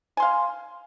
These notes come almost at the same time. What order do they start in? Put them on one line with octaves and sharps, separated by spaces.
G#5 C6 F5